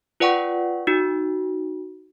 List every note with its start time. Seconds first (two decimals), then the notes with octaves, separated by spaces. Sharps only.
0.20 F4 B4 D5 F#5 G5 C#6
0.87 D#4 F#4